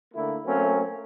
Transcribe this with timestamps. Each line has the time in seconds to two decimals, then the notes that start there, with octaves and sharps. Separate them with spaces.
0.14 D3 A3 A#3 E4
0.45 F#3 A3 A#3 C4 C#4